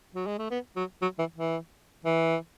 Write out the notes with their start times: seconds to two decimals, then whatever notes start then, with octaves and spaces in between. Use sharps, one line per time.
0.15 F#3
0.27 G#3
0.38 A3
0.51 B3
0.76 F#3
1.02 F#3
1.19 E3
1.36 E3
2.05 E3